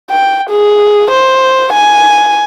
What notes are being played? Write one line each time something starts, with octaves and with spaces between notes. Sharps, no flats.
G5
G#4
C5
G#5